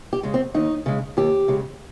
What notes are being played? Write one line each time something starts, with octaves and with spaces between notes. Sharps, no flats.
G4
C#3 G#3
C4
D#2 D#4
C#3 G#3
D#2 G4
C#3 G#3